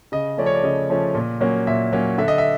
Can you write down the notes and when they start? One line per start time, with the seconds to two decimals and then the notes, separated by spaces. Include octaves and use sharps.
0.12 C#3 D#5
0.38 F3 A3 C#4 D5
0.46 C#5
0.55 D5
0.63 C#3 D#5
0.90 F3 A3 C#4
1.15 A#2
1.41 F#3 A#3 C#4
1.67 A#2 E5
1.93 F#3 A#3 C#4
2.18 D3 E5
2.28 D#5
2.38 E5